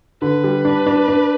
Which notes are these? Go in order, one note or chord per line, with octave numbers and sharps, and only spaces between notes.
D3 B4
G3
D4
D4
D4